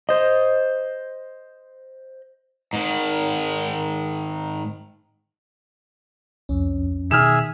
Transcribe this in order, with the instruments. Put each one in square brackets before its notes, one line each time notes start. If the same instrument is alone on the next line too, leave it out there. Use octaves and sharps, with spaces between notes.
[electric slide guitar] C5 D#5
[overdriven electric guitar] G#2 D#3
[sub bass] C2 [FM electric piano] F2 C#4
[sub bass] B2 [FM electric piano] D#3 [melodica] G#4 E5 [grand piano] F6 E7